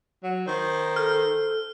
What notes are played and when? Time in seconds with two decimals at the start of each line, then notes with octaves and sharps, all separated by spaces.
0.23 F#3
0.47 D#3 C5
0.96 A4 F6